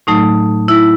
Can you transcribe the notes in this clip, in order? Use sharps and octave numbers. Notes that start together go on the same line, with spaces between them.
A2 F#3 A3 D#4
E4